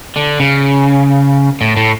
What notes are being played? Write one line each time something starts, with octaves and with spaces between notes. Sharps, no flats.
D3
C#3
A2
A2